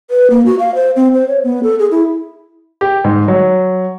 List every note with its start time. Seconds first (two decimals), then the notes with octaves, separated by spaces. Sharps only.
0.10 B4
0.30 A#3
0.46 F#4
0.59 F5
0.75 C5
0.96 C4
1.14 C5
1.28 C#5
1.44 B3
1.63 A4
1.79 G#4
1.91 E4
2.81 G4
3.04 G#2
3.28 F#3